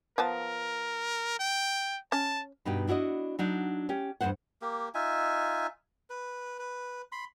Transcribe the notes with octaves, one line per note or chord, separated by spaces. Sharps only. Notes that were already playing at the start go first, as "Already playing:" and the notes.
F3 B3 A#4 A5
G5
C#4 A5
G2 B2 D#4 G4
D4 E4 F#4 C#5 D#5
F#3 D4 D#4
C#4 G4
E2 G2 A#2 E3 C5 F#5
A#3 G4
D#4 F4 E5 G#5
B4
B4
B5 C6